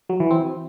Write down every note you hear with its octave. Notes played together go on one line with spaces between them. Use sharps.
F#3
E3
C4